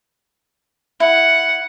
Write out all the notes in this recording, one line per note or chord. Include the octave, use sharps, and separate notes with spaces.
E4 F#5